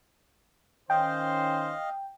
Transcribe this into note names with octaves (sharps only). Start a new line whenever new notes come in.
D#3 C#4 C5 D#5 F5 G5